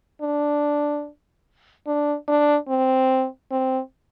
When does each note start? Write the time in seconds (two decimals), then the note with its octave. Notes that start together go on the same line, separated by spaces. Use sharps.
0.21 D4
1.87 D4
2.28 D4
2.68 C4
3.51 C4